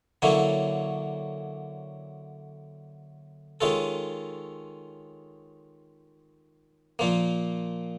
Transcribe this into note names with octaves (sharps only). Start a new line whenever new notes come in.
D3 F#3 A#3 C#4 E4
D#3 G#3 C#4 F4 A4
A#2 F3 A#3